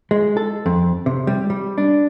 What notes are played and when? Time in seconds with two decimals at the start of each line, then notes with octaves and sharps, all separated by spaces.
0.11 G#3
0.37 A4
0.66 F2
1.06 C3
1.27 G3
1.50 G3
1.78 D4